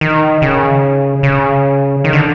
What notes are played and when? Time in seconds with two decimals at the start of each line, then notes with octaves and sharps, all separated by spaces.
0.01 D#3
0.42 C#3
1.23 C#3
2.04 D#3
2.13 D3